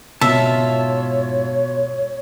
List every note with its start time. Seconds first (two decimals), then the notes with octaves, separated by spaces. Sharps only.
0.21 G#2 B2 F4 C#5 E5 A5